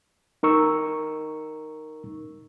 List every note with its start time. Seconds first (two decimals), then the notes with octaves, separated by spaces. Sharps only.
0.43 D#4 A#4 C#6 E6